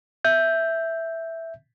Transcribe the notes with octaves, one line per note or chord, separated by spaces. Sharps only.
E5 G6